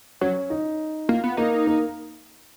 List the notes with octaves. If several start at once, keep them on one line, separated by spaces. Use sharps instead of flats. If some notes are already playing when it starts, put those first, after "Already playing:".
F#3 C#4
D#4
A#3 F4
B3
A#3 D#4
A#3